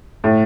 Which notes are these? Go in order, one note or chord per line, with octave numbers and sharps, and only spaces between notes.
A2